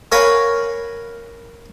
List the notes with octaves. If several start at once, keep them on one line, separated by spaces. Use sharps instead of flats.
A#4 C#5 F5 F#5 G#5 B5